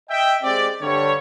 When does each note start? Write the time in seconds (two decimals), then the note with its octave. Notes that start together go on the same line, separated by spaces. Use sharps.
0.10 D#5 E5 G5
0.43 G#3 C4 G4 D5
0.82 G2 D3 G3 C#5